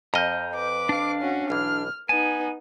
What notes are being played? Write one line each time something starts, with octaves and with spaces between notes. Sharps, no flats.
F2 D#5 A#5 F6 G6
B4 D6
D4 F5
C#4 F#4
B1 E3 F6
B3 D#4 G#5 A5